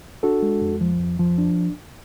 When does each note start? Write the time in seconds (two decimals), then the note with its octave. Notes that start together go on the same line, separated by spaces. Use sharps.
0.23 D4 F#4 A4
0.42 G#3
0.62 F2
0.81 F3
1.00 F2
1.19 F3
1.38 D4